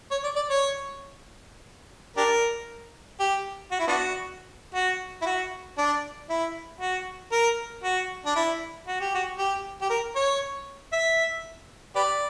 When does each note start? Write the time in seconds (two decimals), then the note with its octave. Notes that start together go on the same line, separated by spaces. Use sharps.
0.11 C#5
0.23 D5
0.36 D5
0.50 C#5
2.17 D4 G4 A#4
3.20 G4
3.71 F#4
3.80 E4
3.88 B3 D4 F#4
4.74 F#4
5.22 E4
5.26 F#4
5.78 D4
6.29 E4
6.80 F#4
7.32 A#4
7.83 F#4
8.25 D4
8.35 E4
8.87 F#4
9.00 G4
9.14 F#4
9.38 G4
9.81 G4
9.89 A#4
10.15 C#5
10.92 E5
11.96 G4 B4 D5